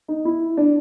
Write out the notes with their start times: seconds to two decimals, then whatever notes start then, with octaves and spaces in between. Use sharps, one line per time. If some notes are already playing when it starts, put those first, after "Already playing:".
0.08 D#4
0.25 E4
0.57 D4